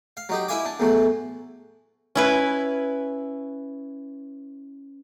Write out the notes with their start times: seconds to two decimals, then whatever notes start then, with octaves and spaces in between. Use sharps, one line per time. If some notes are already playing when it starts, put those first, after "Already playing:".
0.17 F5
0.29 F#3 D#4 G4
0.48 E4 B4 E5 F5 G#5 D6
0.65 D4
0.80 E2 A2 F#3
2.15 C#4 E4 B4